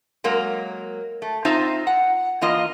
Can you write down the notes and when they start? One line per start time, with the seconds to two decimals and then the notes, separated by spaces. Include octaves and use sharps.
0.24 F#3 G#3 A#3 A#4
1.22 A3
1.45 C4 D#4 F4 C5 E5 A#5
1.87 F#5
2.41 E3 A#3 F4 D#5